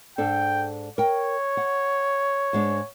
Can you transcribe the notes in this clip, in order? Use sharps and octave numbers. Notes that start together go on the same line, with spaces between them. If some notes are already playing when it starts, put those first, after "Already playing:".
G#2 D4 A4 G5
A#4 C#5 G5
F#5
G#2 G#3 D4